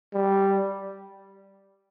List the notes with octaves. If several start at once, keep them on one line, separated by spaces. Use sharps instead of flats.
G3